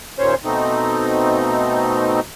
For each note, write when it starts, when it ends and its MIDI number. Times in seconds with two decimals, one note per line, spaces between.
0.19 0.34 39
0.19 0.34 46
0.19 0.34 61
0.19 0.34 72
0.19 0.34 73
0.45 2.20 47
0.45 2.20 57
0.45 2.20 60
0.45 2.20 63